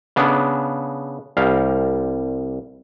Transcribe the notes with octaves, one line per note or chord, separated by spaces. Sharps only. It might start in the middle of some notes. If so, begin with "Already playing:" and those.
C#3 B3 D4
C2 G3 F5